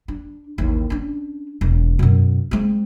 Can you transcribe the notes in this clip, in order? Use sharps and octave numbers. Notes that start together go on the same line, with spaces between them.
D4
A1 D#2
C#4 D4
E1
F#2 B2
G#3 C4